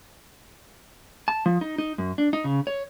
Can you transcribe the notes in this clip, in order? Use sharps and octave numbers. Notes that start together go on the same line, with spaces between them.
A5
F3
D#4
D#4
F#2
D4
D#4
C#3
C#5